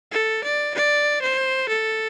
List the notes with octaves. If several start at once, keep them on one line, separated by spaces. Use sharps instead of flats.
A4
D5
D5
C5
A4